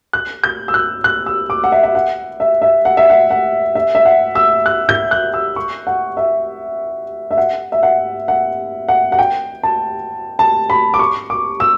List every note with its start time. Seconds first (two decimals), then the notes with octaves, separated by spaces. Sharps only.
0.13 F#6
0.44 G6
0.68 E6
0.74 F#6
1.04 F#6
1.26 E6
1.50 D6
1.64 F#5
1.72 E5
1.83 E5
1.95 F#5
2.40 E5
2.62 E5
2.85 F#5
2.97 E5
3.10 F#5
3.30 F#5
3.75 E5
3.95 E5
4.05 F#5
4.35 E6
4.66 F#6
4.89 G6
5.11 F#6
5.34 E6
5.56 C#6
5.87 F#5
6.17 E5
7.31 E5
7.37 F#5
7.72 E5
7.83 F#5
8.28 F#5
8.88 F#5
9.12 F#5
9.19 G5
9.63 A5
10.39 A5
10.70 B5
10.94 D6
10.99 C#6
11.30 D6
11.60 E6